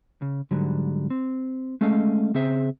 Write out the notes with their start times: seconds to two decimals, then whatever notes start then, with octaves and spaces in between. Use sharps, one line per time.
0.22 C#3
0.51 G#2 D3 F#3 G3
1.10 C4
1.81 G#3 A3 C#4 A4 D#5 F5
2.34 C#3 C4 G#4 C5 E5